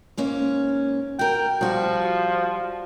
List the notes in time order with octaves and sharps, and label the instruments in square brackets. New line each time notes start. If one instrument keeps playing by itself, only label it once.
[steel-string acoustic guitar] G#2 A#3 C#4
[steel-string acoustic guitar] F#4 A#4 [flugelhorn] G5
[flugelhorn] F3 [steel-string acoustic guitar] G3 F#4